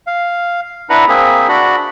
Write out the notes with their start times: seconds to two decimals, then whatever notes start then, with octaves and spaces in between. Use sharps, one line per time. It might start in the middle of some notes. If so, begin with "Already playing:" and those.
0.07 F5
0.90 D4 E4 B4 F#5 A#5 B5
1.08 A#3 C4 G#4 E5
1.48 D4 F#4 B5